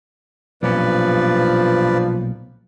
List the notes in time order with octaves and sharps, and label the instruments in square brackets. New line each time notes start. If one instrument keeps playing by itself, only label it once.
[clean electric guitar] B1 A#2 C#4 [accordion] G2 B4 D5 [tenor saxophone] F3